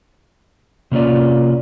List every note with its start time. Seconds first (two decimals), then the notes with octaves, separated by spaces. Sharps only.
0.92 C3 A#3 C#4 D#4 F4 D5